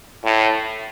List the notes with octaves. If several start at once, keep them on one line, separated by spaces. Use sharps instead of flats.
A2